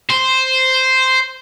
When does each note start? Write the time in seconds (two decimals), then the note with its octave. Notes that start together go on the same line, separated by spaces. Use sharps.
0.10 C5